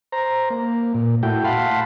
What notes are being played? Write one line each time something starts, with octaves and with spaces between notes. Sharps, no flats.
C5 A#5
A#3
A#2
A2 A3 E4 F#4 G5
F5 F#5 A5 B5 C6